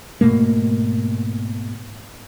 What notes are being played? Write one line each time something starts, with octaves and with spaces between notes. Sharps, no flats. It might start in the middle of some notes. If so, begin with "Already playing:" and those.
G#2 B2 A3 A#3